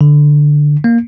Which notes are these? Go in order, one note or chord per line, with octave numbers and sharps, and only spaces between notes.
D3
A#3